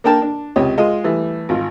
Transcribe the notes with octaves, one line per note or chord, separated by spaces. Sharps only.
A#3 D4 A#4 G5 A5
D4
C#2 C3 G4 C#5 D#5
G#3 F4 D#5
E3 G3 A3
G#1 F4